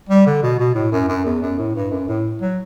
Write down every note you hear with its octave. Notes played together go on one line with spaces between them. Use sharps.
G3
D3
B2
B2
A2
F#2
F#2
E2
F#2
A2
G2
F#2
A2
F#3